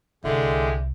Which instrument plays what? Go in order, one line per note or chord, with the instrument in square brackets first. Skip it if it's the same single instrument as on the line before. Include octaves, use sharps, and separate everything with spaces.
[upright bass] C2 [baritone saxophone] D3 [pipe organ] G#3 G4 [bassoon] E4